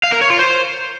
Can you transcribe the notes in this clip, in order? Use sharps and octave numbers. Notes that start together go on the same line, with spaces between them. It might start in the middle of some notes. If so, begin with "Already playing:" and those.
F5
A#4
C#5
F4
C5